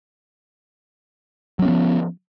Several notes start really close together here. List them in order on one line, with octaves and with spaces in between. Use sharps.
F#3 C#4 B3 F3